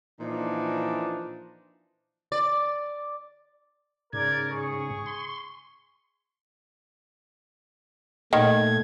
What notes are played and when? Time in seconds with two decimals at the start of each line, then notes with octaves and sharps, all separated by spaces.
0.19 A#2 E3 F3 D4 D#4
2.32 D5
4.13 G#2 C#3 A#4 D5 G#6
4.51 G#4 C#6
5.06 C6
8.33 A#2 D#3 A3 G#6